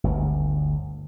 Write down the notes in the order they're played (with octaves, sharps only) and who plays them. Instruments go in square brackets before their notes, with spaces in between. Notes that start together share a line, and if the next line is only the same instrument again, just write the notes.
[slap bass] G1 D2